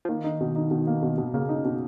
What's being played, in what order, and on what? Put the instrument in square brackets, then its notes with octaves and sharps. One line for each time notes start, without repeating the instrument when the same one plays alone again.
[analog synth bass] F3
[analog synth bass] D#3 [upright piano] A#3
[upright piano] D#4
B2
D#4
B2
A#3
B2
B2
[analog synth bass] C#3 [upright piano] A#3
[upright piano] D#4
B2